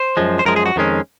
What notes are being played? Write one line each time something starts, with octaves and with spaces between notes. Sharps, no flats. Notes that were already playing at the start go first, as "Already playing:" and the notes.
Already playing: C5
F#2 F3 G#3
C5
F#2 F3 G#3 A#4
G#4
F#4
F2 D#3 G#3 C#4